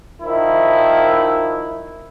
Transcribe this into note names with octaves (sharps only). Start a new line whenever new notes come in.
D#3 F3 E4